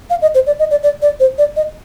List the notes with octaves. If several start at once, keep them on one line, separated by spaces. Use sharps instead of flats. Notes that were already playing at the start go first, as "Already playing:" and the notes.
F5
D#5
C5
D5
D#5
D5
D5
D5
C5
D5
D#5